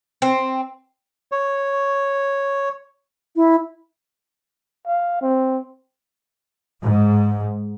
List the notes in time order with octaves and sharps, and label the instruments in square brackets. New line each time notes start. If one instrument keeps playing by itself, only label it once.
[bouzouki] C4
[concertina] C#5
[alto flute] E4
[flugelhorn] F5
C4
[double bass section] G#2